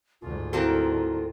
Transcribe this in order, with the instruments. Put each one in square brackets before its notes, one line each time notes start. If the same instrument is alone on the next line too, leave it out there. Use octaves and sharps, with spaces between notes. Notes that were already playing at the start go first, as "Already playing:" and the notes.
[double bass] D2 G#2 [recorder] F4
[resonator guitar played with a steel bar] A#3 C4 A4 [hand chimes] E4 F#4